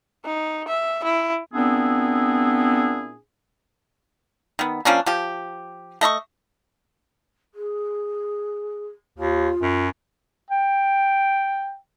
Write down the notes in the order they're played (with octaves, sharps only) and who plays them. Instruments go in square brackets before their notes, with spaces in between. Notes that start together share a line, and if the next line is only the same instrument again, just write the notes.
[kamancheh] D#4
E5
E4
[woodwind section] A#2 B3 C4 D4 E4 G#4
[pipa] D#3 B3
F3 A#3 C#4 D4
F3 G4
A3 D#5 B5 C#6
[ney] G#4
[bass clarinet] D#2 [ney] F4
[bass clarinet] F#2
[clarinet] G5